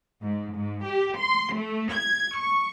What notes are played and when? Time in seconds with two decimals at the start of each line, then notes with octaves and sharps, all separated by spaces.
0.22 G#2
0.55 G#2
0.85 G4
1.18 C6
1.54 A3
1.92 G#6
2.38 C#6